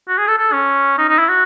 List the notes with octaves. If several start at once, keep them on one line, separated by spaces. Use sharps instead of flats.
F#4
G#4
A4
A4
C#4
D#4
D#4
E4
F#4